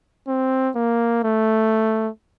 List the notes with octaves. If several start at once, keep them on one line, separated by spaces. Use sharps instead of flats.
C4
A#3
A3